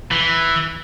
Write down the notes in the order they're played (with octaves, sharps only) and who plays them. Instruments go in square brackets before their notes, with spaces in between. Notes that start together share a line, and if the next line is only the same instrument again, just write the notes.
[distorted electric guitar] E3